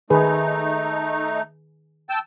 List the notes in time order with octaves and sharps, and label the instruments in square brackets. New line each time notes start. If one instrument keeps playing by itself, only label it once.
[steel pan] D#3 G#4 B4 [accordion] A3 D#4
[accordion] G5 A5 E6